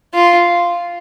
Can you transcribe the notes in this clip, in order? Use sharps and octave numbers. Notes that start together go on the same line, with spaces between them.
F4